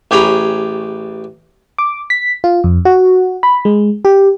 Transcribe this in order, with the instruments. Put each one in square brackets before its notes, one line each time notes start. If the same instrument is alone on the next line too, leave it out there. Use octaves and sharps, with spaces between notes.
[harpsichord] A1 G4 G#4 C#5 A#5 B5
[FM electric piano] D6
B6
F4
F2
F#4
B5
G#3
G4